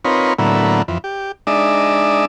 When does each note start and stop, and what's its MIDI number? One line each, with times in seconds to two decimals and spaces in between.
0.05 0.33 60
0.05 0.33 63
0.05 0.33 65
0.05 0.33 70
0.05 0.33 71
0.05 0.33 73
0.39 0.82 45
0.39 0.82 50
0.39 0.82 54
0.39 0.82 58
0.39 0.82 59
0.39 0.82 64
0.88 0.98 41
0.88 0.98 52
1.04 1.32 67
1.47 2.25 56
1.47 2.25 62
1.47 2.25 63
1.47 2.25 74
1.47 2.25 76